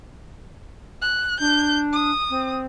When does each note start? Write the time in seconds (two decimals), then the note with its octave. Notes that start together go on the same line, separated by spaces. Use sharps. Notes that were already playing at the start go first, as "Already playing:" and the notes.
1.02 F#6
1.40 D4 G6
1.93 D#6
2.30 C4